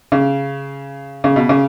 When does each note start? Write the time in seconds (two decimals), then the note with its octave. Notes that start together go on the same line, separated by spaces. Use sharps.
0.12 C#3
1.24 C#3
1.36 B2
1.49 C#3